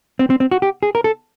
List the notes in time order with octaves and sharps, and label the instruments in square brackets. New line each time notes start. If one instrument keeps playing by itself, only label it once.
[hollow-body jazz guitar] C4
C4
C4
F#4
G4
G#4
A#4
A4